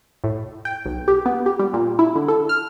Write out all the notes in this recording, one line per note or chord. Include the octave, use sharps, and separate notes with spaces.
A2
G5
B1
G4
B3
G4
G3
A#2
E4
D3
A4
F6